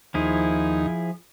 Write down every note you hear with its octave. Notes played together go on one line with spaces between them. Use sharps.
D#2 F3 D#4 E4 G#4